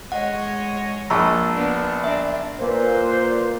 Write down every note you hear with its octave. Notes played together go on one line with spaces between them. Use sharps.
G#3 C#5 D#5 F#5
A#1 A5 A#5 C#6 E6
B3 D4
D4 E5
A#2 A#3 E4 B4 C5